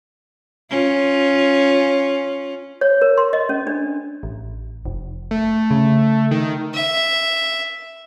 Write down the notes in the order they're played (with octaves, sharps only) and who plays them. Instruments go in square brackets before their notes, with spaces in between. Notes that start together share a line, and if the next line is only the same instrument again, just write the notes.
[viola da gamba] C#4 F4
[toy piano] C#5
A#4
C6
D#5
C#4
D4
[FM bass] A1
F1
[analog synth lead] A3
[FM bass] C#3
[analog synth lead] D#3
[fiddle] E5